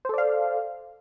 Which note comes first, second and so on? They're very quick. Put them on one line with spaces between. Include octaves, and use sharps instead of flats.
C5 A4 D5 F5